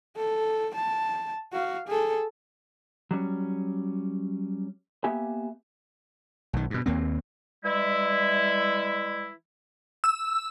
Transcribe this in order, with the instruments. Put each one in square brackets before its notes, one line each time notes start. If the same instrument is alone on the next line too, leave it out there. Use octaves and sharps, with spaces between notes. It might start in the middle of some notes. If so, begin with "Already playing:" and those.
[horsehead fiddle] A4
A5
F#4 F5
G#4 A4
[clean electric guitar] F#3 G3 C#4
A#3 B3 G4 E5 G#5
[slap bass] B1 D#3
G2 B2
D#2 A#3 C4
[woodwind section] E3 G3 G#3 E4
[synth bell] E6